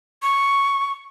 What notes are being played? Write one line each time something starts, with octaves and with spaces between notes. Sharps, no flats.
C#6